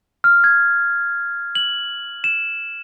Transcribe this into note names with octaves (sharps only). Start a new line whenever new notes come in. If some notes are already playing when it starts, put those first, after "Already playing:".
F6
G#6
F#7
E7